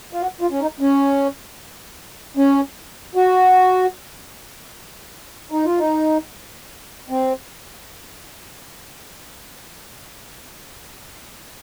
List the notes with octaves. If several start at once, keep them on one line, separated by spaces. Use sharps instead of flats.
F4
F#4
F4
C#4
D#4
C#4
C#4
F#4
D#4
F4
D#4
C4